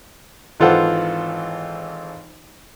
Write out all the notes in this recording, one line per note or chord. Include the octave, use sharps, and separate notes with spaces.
G#1 E3 F4 A4 C5 F#5